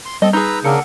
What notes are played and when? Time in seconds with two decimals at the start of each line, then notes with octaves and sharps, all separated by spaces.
0.05 C6
0.22 G3 C4 A4 D#5
0.33 D#4 G#4 B4 A#5 E6 G6
0.64 C#3 A#3 D4 A#4 F#5 E6 C#7